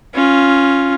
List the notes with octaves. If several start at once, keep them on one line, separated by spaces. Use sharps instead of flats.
C#4 F4